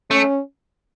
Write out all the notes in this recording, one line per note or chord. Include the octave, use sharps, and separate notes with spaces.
A3 C#4